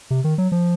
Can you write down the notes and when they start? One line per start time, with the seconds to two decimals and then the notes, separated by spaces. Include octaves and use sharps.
0.11 C3
0.24 D#3
0.38 F#3
0.52 F3